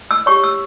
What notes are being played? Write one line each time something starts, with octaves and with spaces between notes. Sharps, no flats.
E6
G4 C#5 C#6
E6